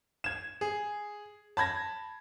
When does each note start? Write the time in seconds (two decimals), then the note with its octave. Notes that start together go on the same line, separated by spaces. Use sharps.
0.24 G#6 E7
0.61 G#4
1.57 A5 B5 G#6 A#6